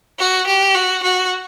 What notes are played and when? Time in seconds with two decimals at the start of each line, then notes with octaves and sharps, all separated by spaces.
0.19 F#4
0.47 G4
0.75 F#4
1.03 F#4